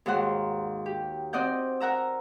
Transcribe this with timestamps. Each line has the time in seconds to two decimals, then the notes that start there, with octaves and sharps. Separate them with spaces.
0.06 D#2 G#2 F#4 F#5 C6
0.86 G4
1.33 C4 D5 D#5 F#5 G6
1.80 A#4 F#5 A#5 E6